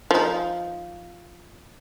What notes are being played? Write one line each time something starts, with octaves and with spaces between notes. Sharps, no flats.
F3 D#4